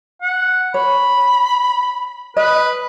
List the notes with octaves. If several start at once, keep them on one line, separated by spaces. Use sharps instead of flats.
F#5
C#5 B5
B4 D#5